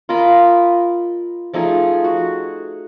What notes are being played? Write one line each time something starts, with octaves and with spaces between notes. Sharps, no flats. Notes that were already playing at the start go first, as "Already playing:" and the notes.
F4 A#4 D#5 B5
F3 A3 D#4 G#4
F#4